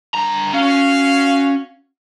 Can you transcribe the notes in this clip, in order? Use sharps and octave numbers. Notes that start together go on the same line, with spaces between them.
G2 A#5
C#4 F#4 F5